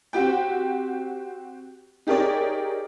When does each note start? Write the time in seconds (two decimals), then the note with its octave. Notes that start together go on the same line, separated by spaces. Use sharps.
0.13 C4 F#4 G4 G5
2.07 D#4 G4 G#4 A#4 C#5 D5